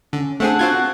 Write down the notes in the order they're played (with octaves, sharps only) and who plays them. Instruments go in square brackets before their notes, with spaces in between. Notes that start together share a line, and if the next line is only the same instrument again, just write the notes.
[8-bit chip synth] D3 [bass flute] C#4
[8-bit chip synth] A3 C4 G#4 [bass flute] D4 [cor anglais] F#5
[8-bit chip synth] C4 F4 G#6 [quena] F#4